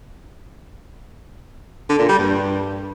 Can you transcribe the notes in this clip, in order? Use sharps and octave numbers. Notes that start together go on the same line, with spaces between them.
D3
A#2
G3
G2